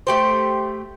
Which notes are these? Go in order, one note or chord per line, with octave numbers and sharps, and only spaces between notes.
A3 G4 C5